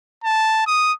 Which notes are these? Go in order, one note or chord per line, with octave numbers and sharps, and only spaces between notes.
A5
D#6